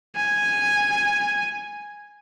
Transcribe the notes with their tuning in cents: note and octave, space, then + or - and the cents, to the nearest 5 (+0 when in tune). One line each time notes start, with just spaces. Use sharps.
G#5 -5